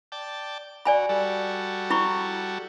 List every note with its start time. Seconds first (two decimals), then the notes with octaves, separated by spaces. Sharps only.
0.12 D5 G5 A5
0.85 F#4 D5 G#5 B5
1.09 G3 F#4 A4
1.90 E4 B5 C#6